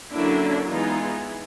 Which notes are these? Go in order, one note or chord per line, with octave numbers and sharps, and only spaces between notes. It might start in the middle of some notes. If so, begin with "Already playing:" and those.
D3 F#3 A#3 C#4 D4 E4
E3 G#3 B3 D#4 F4